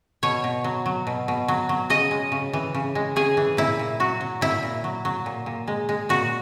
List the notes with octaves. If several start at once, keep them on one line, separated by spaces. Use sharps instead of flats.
B2 C#5
B2
F#3
F#3
B2
B2
F#3
F#3
C#3 D#5
G#3
C#3
E3
C#3
G#3
C#3 G#4
E3
A#2 E4
A#2
F#3 F#4
F#3
A#2 E4
A#2
F#3
F#3
A#2
A#2
G#3
G#3
A#2 F#4